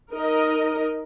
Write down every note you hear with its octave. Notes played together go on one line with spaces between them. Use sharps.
D#4 A#4 D#5